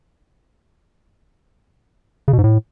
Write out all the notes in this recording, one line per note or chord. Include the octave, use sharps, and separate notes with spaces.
C#3
B2
G#2
A2